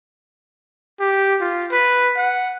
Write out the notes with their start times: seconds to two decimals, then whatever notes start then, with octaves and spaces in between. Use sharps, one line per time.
1.00 G4
1.41 F4
1.72 B4
2.17 F#5